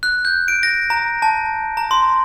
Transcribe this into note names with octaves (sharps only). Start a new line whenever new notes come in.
F#6
G6
D7
A#6
A#5
A5
A#5
C6